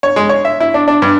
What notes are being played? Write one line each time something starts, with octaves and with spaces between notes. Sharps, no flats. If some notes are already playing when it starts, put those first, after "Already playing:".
C#5
G#3
C#5
E5
E4
D4
D4
G2